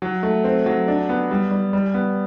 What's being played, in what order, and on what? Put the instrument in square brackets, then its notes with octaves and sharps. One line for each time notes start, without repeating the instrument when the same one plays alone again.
[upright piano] F#3
A3
C4
F#3
D4
B3
G3
G3
G3
B3